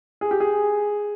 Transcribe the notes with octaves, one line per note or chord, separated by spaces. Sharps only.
G#4
G4
G#4